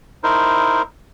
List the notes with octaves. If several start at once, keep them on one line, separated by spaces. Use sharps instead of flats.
D#4 E4 A#4 C5